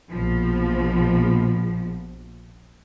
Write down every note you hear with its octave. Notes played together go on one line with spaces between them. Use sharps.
A#1 B2 F3